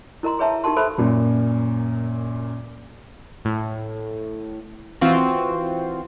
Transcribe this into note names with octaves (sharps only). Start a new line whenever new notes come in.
E4 A#4 D#5 A#5 C6
G#4 B4 C#5 E5 A5 A#5
D#4 G4 A#4 A5 C6
A4 B4 C5 E5 A5 B5
F#2 A#2
A2
E3 C4 F4 F#4